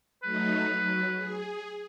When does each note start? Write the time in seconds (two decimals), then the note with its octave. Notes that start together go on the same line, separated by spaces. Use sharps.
0.23 F#3 A3 D#4 B4
0.79 F#3
1.15 G#4